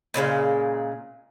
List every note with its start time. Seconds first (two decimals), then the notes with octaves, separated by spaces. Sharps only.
0.14 A#2 C#3 F#3 G#3